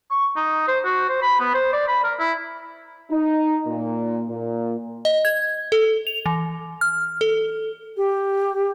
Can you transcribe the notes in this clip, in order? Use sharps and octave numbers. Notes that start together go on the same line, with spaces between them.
C#6
D#4
C5
F#4
C5
B5
B3
C5
D5
B5
A#4
E4
D#4
A#2
A#2
D#5
G#6
A4
F7
E3
F6
A4
G4